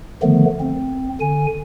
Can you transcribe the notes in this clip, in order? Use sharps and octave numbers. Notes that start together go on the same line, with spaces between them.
D3 D#3 F3 A3 B3
C4
D3 G#5